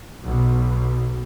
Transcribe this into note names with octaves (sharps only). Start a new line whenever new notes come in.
B1 B2